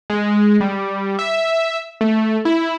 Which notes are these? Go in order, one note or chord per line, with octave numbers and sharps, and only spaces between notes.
G#3
G3
E5
A3
E4